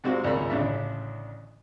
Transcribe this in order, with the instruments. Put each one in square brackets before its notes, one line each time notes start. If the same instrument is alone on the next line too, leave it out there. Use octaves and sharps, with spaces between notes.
[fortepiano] G#2 C3 G#3 C4 F4 F#4
G#1 C#2 A#2 A#4 B5 C6
A1 D2 C#3 D4 E5